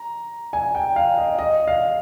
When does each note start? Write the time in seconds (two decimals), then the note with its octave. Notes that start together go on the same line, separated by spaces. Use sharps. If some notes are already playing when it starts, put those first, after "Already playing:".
Already playing: A#5
0.53 G#5
0.75 G5
0.96 F5
1.18 D#5
1.38 D#5
1.67 F5